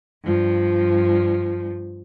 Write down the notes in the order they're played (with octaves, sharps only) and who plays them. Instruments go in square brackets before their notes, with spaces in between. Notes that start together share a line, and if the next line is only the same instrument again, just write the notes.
[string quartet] G2 F3